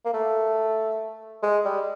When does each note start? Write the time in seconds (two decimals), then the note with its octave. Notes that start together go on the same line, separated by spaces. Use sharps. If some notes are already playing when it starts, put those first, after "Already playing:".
0.05 A#3
0.13 A3
1.43 G#3
1.65 G3